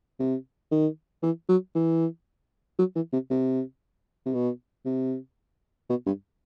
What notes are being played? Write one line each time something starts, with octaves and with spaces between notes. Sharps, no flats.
C3
D#3
E3
F#3
E3
F#3
E3
C3
C3
C3
B2
C3
B2
G2